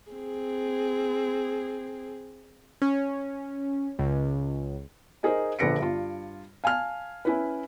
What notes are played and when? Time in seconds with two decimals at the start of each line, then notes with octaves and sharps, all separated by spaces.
0.12 C4 G#4
2.82 C#4
3.99 C#2
5.23 D#4 G#4 A#4 C5 D#5
5.59 A#1 D3 B4 A#6 C#7 D7
5.79 G2 F4
6.64 F5 G#5 A5 F6
7.25 C#4 E4 B4